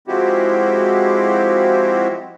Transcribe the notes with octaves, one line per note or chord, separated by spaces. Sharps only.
F3 G#3 C4 E4 F#4 G4